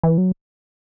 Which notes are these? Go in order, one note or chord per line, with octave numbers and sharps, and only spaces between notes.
E3
F#3